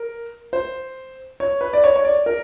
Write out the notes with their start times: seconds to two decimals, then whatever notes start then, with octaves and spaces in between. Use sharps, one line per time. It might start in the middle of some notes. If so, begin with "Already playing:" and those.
Already playing: A#4
0.53 C5
1.40 C#5
1.61 B4
1.73 D5
1.84 C#5
1.96 C#5
2.05 D5
2.26 A#4